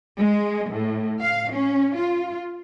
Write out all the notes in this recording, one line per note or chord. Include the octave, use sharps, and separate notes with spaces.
G#3
A2
F5
C#4
F4